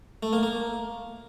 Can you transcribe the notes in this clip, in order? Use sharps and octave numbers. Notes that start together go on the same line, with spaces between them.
A3
A#3
A#3